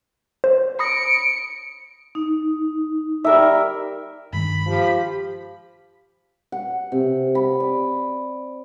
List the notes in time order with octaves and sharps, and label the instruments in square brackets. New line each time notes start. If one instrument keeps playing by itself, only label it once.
[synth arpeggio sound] C5
[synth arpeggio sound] B5 D#6 A#6 [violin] C#7 D7
[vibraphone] D#4
[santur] G3 A#4 E5
[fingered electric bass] G2 D#3 G#3 [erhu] B5
[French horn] F3 [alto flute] G4
[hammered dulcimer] F#5
C3
B5
D5